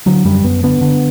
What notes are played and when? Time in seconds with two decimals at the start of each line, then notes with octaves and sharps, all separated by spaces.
0.06 D3 F#3
0.25 F#2 G3
0.44 F#2 B3
0.63 D3 B3
0.81 D3